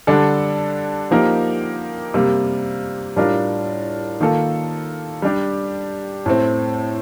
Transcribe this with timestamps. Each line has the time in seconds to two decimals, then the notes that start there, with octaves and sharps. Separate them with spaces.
0.07 D3 G3 D4 A4
1.11 F3 A#3 D#4 G4 A#4
2.14 C3 G3 A#3
3.16 A2 G3 D4 F4 A#4
4.20 D#3 A#3 F4 A4
5.22 G3 D4 G4
6.26 A2 A3 C4